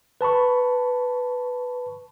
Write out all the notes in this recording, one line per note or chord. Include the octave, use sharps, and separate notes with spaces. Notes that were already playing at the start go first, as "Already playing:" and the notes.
B4 A5 B5 C#6